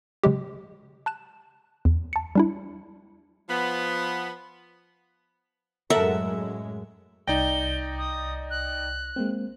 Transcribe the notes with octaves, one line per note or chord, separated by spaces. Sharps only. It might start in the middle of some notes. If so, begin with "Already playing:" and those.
C#3 F#3 G#3 G4
A5 F#6 E7
E2
A5 C#7
G3 D4 E4
F3 B3
F#2 A2 G#3 A4 A#4 E5 F#5
C2 D#4 D5 G5 A#6 G7
D#6
F#6
G#3 A#3 C4